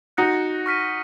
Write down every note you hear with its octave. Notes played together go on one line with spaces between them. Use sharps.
D#4 F#4 F#6 A#6 C#7
C#6 F6 B6 D#7